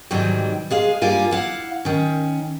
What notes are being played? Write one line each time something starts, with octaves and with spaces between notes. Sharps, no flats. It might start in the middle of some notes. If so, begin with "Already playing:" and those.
G#2 C3 D#3 E3 F#3 G3
G#3 G#4 F5
G2 G3 A#3 F4 A#4 G#5
E4 F5 F#5
D#3 C#4